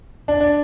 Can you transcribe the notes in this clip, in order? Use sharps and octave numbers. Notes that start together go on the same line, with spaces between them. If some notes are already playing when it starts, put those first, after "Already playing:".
D4
D4